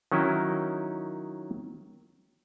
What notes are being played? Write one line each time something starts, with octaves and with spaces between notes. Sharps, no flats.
D#3 F#3 C#4 D#4 E4